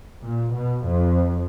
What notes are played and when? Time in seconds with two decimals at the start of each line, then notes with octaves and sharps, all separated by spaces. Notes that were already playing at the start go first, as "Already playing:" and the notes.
0.24 A#2
0.57 B2
0.87 F2